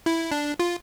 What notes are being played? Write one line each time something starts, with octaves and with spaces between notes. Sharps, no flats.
E4
D4
F4